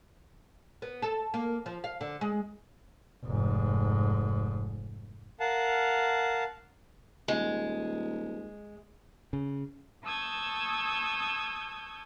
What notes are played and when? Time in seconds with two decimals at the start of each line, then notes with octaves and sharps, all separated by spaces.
0.82 B3
1.02 A4
1.34 A#3
1.66 F3
1.84 F5
2.01 D3
2.21 G#3
3.25 F1 G#2
5.40 A#4 F5 F#5 A5
7.28 D#1 G#3
9.33 C#3
10.03 A5 C#6 D#6 E6 G6 G#6